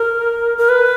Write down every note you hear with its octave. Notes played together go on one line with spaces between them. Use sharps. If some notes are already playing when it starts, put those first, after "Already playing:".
Already playing: A#4
A#4
B4